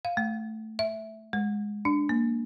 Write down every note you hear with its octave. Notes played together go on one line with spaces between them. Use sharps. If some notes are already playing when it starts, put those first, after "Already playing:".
F5
A3
E5
G#3
D4
A#3